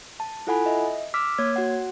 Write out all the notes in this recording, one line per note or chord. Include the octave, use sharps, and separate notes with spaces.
A5
E4 F4 A4 F#5 G#5 B5
D#5 E5
D6 E6 F6 B6
A#3 C#5 G#6
F#4 F#5